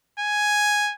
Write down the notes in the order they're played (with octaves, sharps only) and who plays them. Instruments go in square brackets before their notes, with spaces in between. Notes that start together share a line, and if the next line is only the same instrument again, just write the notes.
[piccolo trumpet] G#5